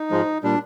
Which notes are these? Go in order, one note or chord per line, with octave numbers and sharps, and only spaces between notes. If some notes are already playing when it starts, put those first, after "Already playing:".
Already playing: D#4
G#2 F3 G#3
A#2 G3 D4